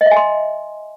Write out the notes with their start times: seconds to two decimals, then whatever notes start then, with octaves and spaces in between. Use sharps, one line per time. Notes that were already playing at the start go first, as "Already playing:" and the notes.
0.01 D#5
0.06 E5
0.11 G#5
0.16 C6